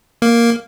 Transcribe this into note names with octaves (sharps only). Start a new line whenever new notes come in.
A#3